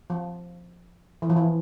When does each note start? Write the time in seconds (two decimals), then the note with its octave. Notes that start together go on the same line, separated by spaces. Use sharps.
0.10 F3
1.22 E3
1.30 F3
1.36 E3